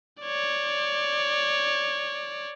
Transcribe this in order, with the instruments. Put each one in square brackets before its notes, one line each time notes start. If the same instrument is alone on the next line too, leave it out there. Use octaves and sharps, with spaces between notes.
[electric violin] C#5 D5